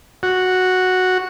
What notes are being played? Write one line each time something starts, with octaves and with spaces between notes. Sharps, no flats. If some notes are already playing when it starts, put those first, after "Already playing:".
F#4